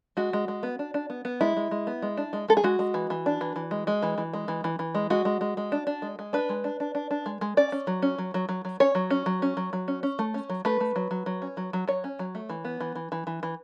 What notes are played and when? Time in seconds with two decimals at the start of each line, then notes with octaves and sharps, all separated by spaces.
0.17 G#3 F#4
0.33 G#3
0.48 G#3
0.63 B3
0.79 D4
0.94 D4
1.10 B3
1.25 B3
1.41 G#3 E4
1.57 G#3
1.71 G#3
1.87 B3
2.02 G#3
2.17 D4
2.33 G#3
2.48 G#3 A4
2.57 G#4
2.64 G#3 F#4
2.79 G#3
2.94 E3
3.10 E3
3.26 D4
3.41 E3
3.56 E3
3.71 G#3
3.87 G#3
4.03 E3
4.18 E3
4.33 G#3
4.48 E3
4.64 E3
4.79 E3
4.95 G#3
5.10 G#3 F#4
5.25 G#3
5.41 G#3
5.57 G#3
5.72 D4
5.87 D4
6.02 G#3
6.19 G#3
6.33 D4 B4
6.49 G#3
6.64 D4
6.80 D4
6.95 D4
7.11 D4
7.26 G#3
7.41 G#3
7.57 C#4 D5
7.72 C#4
7.87 F#3
8.02 C#4
8.18 F#3
8.34 F#3
8.49 F#3
8.65 F#3
8.80 C#4 C#5
8.95 F#3
9.10 C#4
9.26 F#3
9.42 C#4
9.57 F#3
9.73 F#3
9.88 C#4
10.03 C#4
10.19 A3
10.34 C#4
10.50 F#3
10.65 A3 B4
10.81 A3
10.96 F#3
11.11 F#3
11.26 F#3
11.42 C#4
11.57 F#3
11.73 F#3
11.88 F#3 C#5
12.04 C#4
12.19 F#3
12.35 A3
12.49 E3
12.65 B3
12.81 E3
12.96 E3
13.12 E3
13.27 E3
13.43 E3